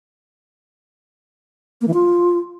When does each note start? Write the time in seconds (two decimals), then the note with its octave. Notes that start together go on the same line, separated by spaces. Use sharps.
1.81 A#3
1.87 E3
1.94 F4